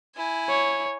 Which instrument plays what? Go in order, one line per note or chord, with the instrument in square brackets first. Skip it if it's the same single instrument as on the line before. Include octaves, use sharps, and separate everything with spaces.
[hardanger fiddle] E4 G#5
[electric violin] C#5